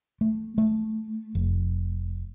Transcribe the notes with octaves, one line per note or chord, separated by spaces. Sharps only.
A3
A3
F1